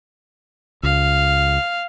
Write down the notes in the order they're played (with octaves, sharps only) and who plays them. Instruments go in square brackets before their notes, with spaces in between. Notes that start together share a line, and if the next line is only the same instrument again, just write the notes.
[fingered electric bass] C#2 [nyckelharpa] F5